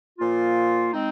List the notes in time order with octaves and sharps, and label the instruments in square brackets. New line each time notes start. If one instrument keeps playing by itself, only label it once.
[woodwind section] A#2 F3 A#3 F4
G#3 C4 D#4